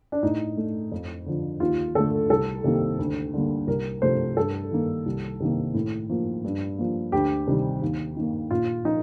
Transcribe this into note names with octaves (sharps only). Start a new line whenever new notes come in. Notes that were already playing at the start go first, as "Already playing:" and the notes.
D4
A2 D#4
A3
F2
D3 F3
D#2 F4
D3 A3 A4
C2 A4
C3 D#3 G3 A#3
D2
D3 G3 A#3
C2 A#4
C3 F3 A3 C5
G2 A4
D#3 A#3
C2
C3 D#3 A#3
A2
F3 A#3
G2
F3 A#3
D2 G4
C3 D#3 G3
D#2
D#3 A#3
A#2 F4
F3 D#4